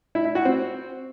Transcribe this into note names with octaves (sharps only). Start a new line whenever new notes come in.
E4
E4
F#4
C4